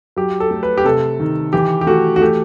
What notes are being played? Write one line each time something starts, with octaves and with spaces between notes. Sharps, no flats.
F#3 G4
A4
A3
B4
G4
C3 A4
D#3
E3 G4
G4
A3 F#4
F#4
A3 G4